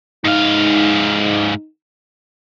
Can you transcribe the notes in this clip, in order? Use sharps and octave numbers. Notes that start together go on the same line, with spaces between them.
G#2 D#4 F5